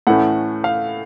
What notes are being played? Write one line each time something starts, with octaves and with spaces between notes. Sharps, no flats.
A2 E3 A3 C#4 F#5
F5